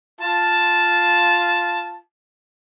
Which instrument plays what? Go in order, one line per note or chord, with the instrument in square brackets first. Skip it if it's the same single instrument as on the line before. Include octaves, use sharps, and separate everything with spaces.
[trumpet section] F4 A5